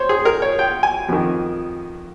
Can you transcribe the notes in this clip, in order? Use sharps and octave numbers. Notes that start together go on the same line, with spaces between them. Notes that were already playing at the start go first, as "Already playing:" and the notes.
Already playing: C5 C#5
G#4
A#4
C#5
G5
G#5
F2 D#3